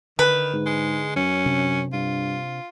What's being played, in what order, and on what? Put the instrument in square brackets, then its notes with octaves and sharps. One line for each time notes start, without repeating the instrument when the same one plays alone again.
[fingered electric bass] D3 [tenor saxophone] D#3 [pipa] B4
[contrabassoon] G#2
[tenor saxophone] G#3
[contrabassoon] F#2 [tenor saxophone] C#4
[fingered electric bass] C3 D4
[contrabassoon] G2 [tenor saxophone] F4